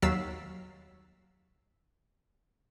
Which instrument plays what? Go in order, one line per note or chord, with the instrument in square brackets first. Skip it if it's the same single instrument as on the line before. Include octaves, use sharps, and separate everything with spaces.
[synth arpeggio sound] D#2 F#3 F5 E6 A6 B6